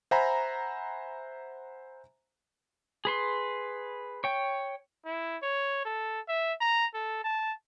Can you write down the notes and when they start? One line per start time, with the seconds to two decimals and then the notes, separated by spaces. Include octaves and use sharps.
0.11 C5 E5 F#5 G#5 A#5 B5
3.05 G#4 B4 C6
4.24 C#5 G5
5.05 E4
5.43 C#5
5.85 A4
6.28 E5
6.61 A#5
6.94 A4
7.24 A5